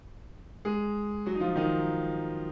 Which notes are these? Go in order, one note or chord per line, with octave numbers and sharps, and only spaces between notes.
G#3 G#4
F#3 F#4
D#4
F3 F4
D#3 D#4